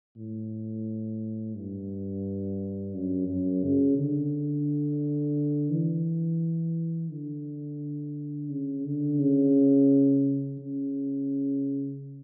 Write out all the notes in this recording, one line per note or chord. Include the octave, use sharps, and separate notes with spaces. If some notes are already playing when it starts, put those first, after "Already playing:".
A2
G2
F#2
F#2
C#3
D3
E3
D3
C#3
D3
C#3
C#3